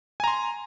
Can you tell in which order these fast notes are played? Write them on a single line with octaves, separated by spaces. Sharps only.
G#5 A#5 C6